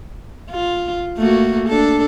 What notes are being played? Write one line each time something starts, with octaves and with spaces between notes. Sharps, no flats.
F4
A3 A#3 F#4
D4 A4